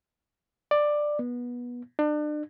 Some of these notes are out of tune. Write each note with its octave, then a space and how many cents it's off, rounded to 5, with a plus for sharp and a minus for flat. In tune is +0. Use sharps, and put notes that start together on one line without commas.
D5 +10
B3 -20
D4 +35